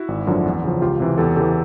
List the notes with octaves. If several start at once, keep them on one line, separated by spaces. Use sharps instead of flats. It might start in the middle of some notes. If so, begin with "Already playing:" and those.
Already playing: E4 F#4
G#1
F#2 D3 F3
E2
C#3 F3
C#2 F4 G4
C3 E3
E2 G4 A4
C#3 E3 G4 A4